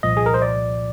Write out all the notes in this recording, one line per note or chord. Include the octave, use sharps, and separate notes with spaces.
C2 A#2 F3 D#5
G#4
A#4
C5
D5